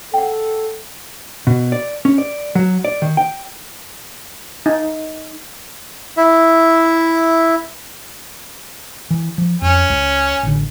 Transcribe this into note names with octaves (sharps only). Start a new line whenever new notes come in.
A4 F#5 G5
B2
D5
C#4
D5
F#3
D5
D#3
G5
D#4
E4 E5
E3
F3
F2 C#4
C#2
A1 D3